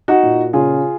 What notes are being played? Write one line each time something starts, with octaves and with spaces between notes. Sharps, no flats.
D#4 F#4
A#2
C#3 F4 G#4